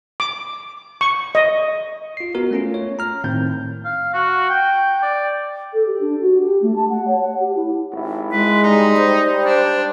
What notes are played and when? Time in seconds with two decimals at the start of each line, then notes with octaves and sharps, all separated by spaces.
0.20 D6
1.01 C#6
1.35 D#5
2.17 F4 C7
2.35 B3 F#4 A#4
2.51 A3 C#4 F4
2.74 C#5
2.99 A#5 F6
3.24 A2 D#3 C4 G6
3.85 F5
4.14 F#4
4.49 G5
5.02 D5
5.74 A4
5.87 G4
6.01 D4
6.21 F#4
6.38 G4
6.62 A3
6.76 A5
6.89 F#5
7.08 C#5
7.21 F#5
7.40 G4
7.56 E4
7.93 G#1 E4
8.32 G#3 B4
8.63 G3 D#4
8.97 C5
9.46 D4